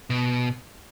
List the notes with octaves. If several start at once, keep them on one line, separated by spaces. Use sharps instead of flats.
B2